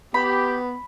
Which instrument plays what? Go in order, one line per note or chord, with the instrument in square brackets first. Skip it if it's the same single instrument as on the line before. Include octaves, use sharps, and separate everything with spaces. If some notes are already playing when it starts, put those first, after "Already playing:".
[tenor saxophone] B3 [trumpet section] G4 [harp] B5